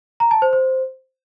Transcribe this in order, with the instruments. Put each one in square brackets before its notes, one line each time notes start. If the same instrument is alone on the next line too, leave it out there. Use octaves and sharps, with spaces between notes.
[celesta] A#5
A5
C5
C5